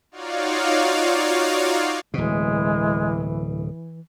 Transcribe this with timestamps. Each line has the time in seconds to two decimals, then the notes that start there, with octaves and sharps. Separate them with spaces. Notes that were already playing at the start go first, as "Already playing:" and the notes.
0.11 D#4 F4 F#4 C#5 D5 F5
2.14 D1 B2 E3 G#3